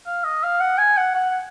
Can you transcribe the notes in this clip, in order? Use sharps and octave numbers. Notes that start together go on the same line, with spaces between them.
F5
D#5
F5
F#5
G#5
F#5
F#5